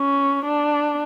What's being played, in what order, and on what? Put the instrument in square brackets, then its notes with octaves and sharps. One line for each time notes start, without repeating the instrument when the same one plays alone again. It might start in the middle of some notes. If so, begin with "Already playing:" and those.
Already playing: [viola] C#4
D4